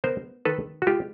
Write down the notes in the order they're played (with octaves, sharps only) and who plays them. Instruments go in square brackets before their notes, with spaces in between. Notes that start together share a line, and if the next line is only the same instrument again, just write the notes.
[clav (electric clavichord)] B3 A#4 C5
D#3 A4 B4
F#4
G#3 F4 G4